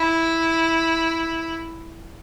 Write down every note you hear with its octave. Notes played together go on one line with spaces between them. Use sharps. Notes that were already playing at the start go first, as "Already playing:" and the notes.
Already playing: E4